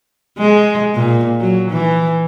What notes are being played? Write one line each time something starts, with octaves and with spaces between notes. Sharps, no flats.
G#3
A#2
F#3
E3